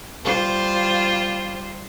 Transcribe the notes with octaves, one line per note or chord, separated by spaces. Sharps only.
G3 F4 C5